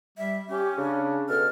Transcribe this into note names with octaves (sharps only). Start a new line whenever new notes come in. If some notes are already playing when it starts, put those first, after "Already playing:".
G3 E5
C#4 G4
C#3 D4
B2 A4 F6